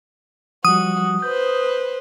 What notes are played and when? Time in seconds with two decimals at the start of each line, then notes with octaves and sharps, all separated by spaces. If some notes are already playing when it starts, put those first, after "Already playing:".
0.65 F3 G3 F#4 D#6
1.22 B4 C5 G6